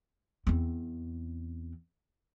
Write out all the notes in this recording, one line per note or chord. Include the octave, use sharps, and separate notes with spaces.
E2 C4